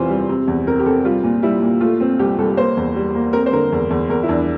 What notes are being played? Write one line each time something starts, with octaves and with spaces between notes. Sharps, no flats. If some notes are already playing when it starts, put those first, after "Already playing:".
Already playing: E2 C3 E3 F4 C5
G3
C3
E2
C4 A#4
G4
C3 A4
G3 F4
A#2
G3 E4
A#2
A3 F4
C4
C2 G4
C2 A4
A#3 C5
E2
G3
A#3
C4 A#4
C5
D3 A#4
E2
E2
E2 A#4
E4
E2 D4